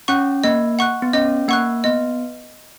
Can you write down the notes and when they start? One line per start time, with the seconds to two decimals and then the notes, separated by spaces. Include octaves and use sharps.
0.08 C#4 F#5 C#6 F#6
0.44 A#3 D#5
0.79 F#5 C#6 F#6
1.02 B3
1.13 C#4 D#5
1.48 A#3 F#5 C#6 F#6
1.84 B3 D#5